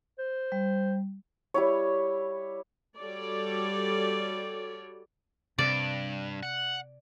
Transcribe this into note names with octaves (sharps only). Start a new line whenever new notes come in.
C5
G3
G3 E4 C#5
G3 F#4 A4 C#5 D5
G2 C3 D5
F#5